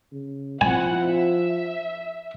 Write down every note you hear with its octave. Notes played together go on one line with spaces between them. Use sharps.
C#3
F3 C4 E4 F#5 G#5
E5